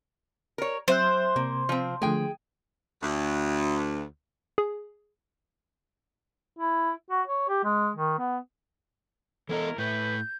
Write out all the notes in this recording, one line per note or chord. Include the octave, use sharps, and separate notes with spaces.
A#4 C#5
F#3 C4 C5 E5 F#6
C3 A#3
F3 C4
D3 F3 A3 G#4 G5
D2
G#4
E4
F#4
C#5
G4
G#3
D#3
B3
C#3 E3 B3 E4 A4 A#4 D#5
A2 E3 A3 B4 G6